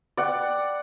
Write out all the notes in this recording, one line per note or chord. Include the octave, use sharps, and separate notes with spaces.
D5 F#5 G5